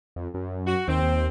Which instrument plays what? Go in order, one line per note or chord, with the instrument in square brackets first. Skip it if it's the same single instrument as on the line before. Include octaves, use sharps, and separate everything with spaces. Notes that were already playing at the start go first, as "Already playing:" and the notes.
[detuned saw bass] F2
F#2
[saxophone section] F#4
[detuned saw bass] D#2 [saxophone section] C4
[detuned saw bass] D#2